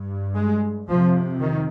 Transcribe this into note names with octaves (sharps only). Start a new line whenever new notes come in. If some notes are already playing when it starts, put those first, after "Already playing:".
Already playing: G2
G#3
F2 C3 F3
D#3